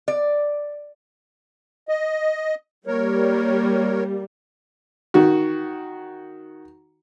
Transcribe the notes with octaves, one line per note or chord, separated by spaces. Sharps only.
D5
D#5
G3 A#3 A#4 C#5
D#3 F#4